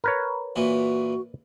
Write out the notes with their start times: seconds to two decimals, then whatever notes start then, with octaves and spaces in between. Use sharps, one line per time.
0.04 A#4 B4 C#5
0.56 A#2 E3 F#4